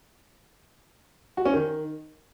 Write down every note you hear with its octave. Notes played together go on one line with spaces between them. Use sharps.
F#4
C#4
D#3